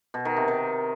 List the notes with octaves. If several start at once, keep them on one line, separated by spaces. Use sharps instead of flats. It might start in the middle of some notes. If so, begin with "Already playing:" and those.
B2
D#3
C3
D#3